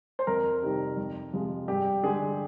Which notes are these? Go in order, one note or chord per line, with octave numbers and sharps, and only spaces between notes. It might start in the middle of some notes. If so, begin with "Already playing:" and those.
C5
F2 A#4
C3 D#3 G3
F2
C3 F3 G#3
G2 G4
D3 G#3 G#4